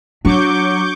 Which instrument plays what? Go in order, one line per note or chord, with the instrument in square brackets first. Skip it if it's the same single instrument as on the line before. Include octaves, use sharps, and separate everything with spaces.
[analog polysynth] F#3 [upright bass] D4 [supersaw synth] C#6 D6 G6